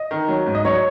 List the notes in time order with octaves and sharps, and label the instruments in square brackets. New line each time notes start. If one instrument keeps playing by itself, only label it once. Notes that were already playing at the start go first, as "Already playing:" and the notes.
Already playing: [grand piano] D#5
[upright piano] D#3
F#3
G#2
[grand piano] D#5
[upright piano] F#3 [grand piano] C#5